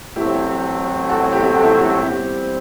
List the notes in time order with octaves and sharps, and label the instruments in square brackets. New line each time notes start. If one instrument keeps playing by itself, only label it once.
[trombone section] A1 A2 F#3 A3 C4 [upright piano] E4 G4
[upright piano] F#4 A4
E4 G4
F#4 A4
E4
F#4
E4 G4
[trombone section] E3 G3 C4 [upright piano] E4 G4